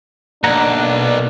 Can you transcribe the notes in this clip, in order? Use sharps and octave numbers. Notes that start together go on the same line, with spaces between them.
B1 A#3 D4 F#5 A#5